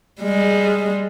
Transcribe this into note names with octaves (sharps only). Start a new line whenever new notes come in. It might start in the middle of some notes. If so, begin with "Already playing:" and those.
G3 G#3